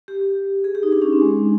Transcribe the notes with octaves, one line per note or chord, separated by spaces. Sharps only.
G4
G#4
G4
D#4
D4
C#4
C4
G#3